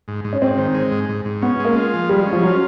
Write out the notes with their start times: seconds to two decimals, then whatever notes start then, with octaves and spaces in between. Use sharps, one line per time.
0.08 G#2
0.25 G#2
0.33 C#4
0.42 G#2 C4
0.58 D#3
0.74 G#3
0.91 G#2
1.09 G#2
1.25 G#2
1.42 B3 C#4
1.60 G#3
1.65 A#3
1.76 F4
1.93 F3
2.09 G3 G#3
2.26 C#4
2.32 F3
2.43 F#3 F4